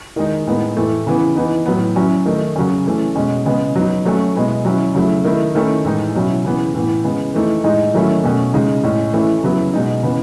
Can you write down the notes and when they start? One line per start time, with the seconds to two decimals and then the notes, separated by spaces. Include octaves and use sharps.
0.16 D#3 G#3 D#4
0.47 A2 G#3 B3 D#4
0.77 A2 E3 A3
1.07 C#3 E3 B3
1.36 E3 B3 D#4
1.66 A2 F#3 B3
1.96 F#3 C#4 E4
2.26 D#3 A3 D#4
2.56 C#3 F#3 C#4
2.86 E3 A3 C#4
3.16 B2 G#3 C#4
3.46 C#3 G#3 B3
3.76 F#3 B3 D#4
4.05 F#3 A3 C#4
4.35 B2 G#3 B3 E4
4.65 F#3 C#4 E4
4.95 C#3 F#3 A3 E4
5.24 D#3 A3 E4
5.55 D#3 A3 C#4 E4
5.85 A2 E3 G#3 D#4
6.15 B2 F#3 C#4 E4
6.45 C#3 E3 B3
6.74 A2 E3 B3
7.04 C#3 G#3 B3
7.34 E3 A3 D#4
7.64 A2 G#3 D#4
7.94 D#3 F#3 A3 C#4 E4
8.24 B2 A3 C#4
8.54 C#3 G#3 D#4
8.83 A2 G#3 C#4
9.13 E3 A3 C#4 E4
9.44 C#3 F#3 B3 E4
9.74 B2 G#3 D#4
10.03 C#3 E3 B3